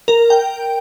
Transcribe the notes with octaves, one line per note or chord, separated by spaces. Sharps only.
A#4
G5